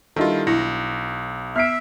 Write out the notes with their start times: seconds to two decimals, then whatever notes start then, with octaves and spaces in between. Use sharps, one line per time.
0.16 D#3 G3 D4 E4 F4 A4 D#5
0.47 B1 E4 A#6
1.56 B3 E5 F6 C7 D7